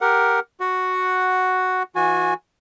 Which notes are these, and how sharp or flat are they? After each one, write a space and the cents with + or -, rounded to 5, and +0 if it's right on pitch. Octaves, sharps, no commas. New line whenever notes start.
G4 +0 A#4 +5 F#5 +0
F#4 +0 F#5 +0
E3 +5 F#4 -25 G#5 +0